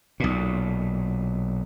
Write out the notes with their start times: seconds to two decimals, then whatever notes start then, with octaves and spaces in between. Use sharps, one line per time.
0.20 B1 A#2